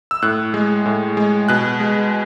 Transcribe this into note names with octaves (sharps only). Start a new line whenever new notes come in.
E6
A2 F#6
G#3
A2
G#3
B2 F#6
G#3